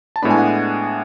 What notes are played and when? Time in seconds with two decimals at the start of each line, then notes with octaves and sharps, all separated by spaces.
0.16 A5
0.22 A2 G#3 B3 D4 B5
0.30 G#5
0.39 F#5